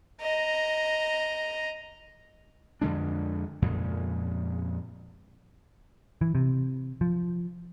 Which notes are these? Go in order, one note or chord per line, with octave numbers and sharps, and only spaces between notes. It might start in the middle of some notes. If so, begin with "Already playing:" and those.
D#5 A#5
F2 D3 G#3 D4
F2 A#2 C#3 G#3
E3
C3
F3